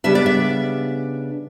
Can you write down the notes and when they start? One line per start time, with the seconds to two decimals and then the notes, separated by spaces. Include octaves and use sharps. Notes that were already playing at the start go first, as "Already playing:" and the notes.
0.04 C#3 G3 B3 D4 E5
0.15 D5
0.26 E5